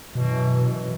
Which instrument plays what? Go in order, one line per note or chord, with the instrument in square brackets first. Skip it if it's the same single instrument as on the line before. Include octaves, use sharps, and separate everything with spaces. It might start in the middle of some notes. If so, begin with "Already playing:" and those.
[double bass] F#2 E3 [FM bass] B2